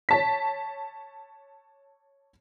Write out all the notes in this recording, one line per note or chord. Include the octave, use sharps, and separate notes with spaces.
C#5 A5 B6